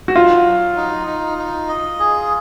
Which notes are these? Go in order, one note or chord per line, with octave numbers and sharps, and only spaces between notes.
F#4
F#3 F4
F#3
D#4
D#4
D#4
D#5
G#4